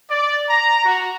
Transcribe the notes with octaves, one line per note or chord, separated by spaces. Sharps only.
D5
A#5
F#4